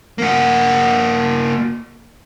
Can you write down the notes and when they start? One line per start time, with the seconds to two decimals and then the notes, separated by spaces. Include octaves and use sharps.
0.18 A#3 F#4